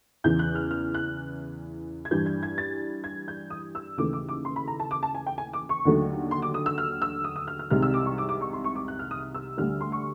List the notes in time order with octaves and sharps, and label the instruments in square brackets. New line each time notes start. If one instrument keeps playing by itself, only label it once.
[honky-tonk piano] E2 C#3 E3 G6
F#6
F6
F6
F#6
G#6
G2 E3 G3 G6
G#6
G#6
A6
G#6
G6
D#6
E6
D#2 C#3 E3 A3 D6
D6
D6
C6
B5
A#5
A5
D6
A5
G#5
G5
G#5
D6
C#6
D#2 D3 F#3 A3
C6
D6
D#6
E6
F6
E6
D#6
D#6
F6
F6
C2 C3 D#3 G#3 F6
E6
D6
C#6
D6
D6
C#6
C6
C#6
D6
F#6
F6
D#6
E6
D2 D3 G3 F6
C6
C#6